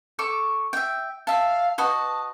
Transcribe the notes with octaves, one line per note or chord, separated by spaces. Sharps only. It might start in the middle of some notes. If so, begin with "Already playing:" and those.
A4 C#6 D6
E5 G5
E5 F5 A5
F#4 B4 D#5 A5